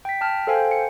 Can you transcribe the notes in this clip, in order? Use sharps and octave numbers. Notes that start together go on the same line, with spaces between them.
G5 B6
G5 A5 F6
A4 C5 F5 G5 G#5
C#7